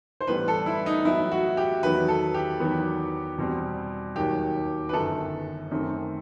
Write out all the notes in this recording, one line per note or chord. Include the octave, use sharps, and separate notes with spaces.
C5
A1 A2 G3 B3 B4
A4
E4
D#4
A1 A2 F#3 B3 E4
F#4
G4
E2 D#3 F#3 B3 B4
A4
G4
E2 D#3 F#3 B3
E2 B2 G3 C4
D#2 D#3 F#3 G4
B4
G1 F#2 D#3 A4
F#2 D#3 A3 C4